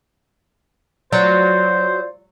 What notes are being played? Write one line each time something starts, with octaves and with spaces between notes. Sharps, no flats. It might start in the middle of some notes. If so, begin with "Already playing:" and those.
F#3 F4 C5 D5